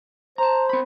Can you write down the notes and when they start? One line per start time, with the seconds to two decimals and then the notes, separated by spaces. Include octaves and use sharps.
0.38 C5 A5 A#5
0.69 C4 B5